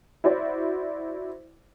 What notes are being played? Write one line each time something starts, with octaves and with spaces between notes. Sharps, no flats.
E4 F#4 C5 D5